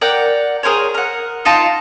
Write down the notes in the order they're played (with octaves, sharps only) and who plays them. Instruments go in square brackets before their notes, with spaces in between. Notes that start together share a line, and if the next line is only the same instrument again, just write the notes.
[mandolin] A#4 D5 F#5 G5
G#4 A#4 C5 C#5
A#4 F#5
D#4 F4 A5 A#5